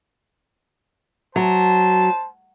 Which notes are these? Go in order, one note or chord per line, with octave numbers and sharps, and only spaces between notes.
F#3 C5 A5